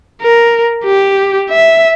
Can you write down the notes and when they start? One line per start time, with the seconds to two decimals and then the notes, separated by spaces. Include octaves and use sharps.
0.22 A#4
0.84 G4
1.50 E5